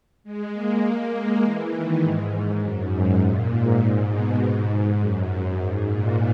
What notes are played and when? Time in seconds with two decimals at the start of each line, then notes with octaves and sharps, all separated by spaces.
0.24 G#3
0.53 A#3
0.83 A#3
1.13 G#3
1.42 E3
1.72 D#3
2.02 G#2
2.61 F#2
2.90 G#2
3.20 A#2
3.50 G#2
3.79 G#2
4.09 B2
4.39 G#2
4.98 F#2
5.57 G#2
5.88 A#2